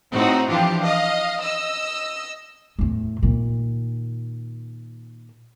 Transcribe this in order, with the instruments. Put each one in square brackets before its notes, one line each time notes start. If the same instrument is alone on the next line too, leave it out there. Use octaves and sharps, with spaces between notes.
[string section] A2 C4 D#4 F#4
E3 F3 D4 F4 G4
D#5 F5
D#5 E6
[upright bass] E2 A2
A#2 D#3